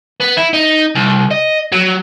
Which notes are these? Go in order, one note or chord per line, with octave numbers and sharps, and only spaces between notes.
B3
E4
D#4
C2
D#5
F#3